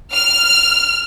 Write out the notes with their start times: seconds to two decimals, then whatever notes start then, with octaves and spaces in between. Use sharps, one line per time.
0.13 F6